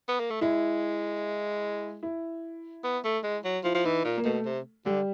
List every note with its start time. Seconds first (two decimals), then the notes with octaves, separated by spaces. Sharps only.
0.08 B3
0.20 A#3
0.30 A3
0.41 G#3 E4
2.03 E4
2.84 B3
3.04 A3
3.23 G#3
3.44 F#3
3.64 F3 E4
3.74 F3
3.84 E3 D#4
4.04 A#2
4.17 A#3
4.25 B2 A3
4.45 C3
4.86 D3 G3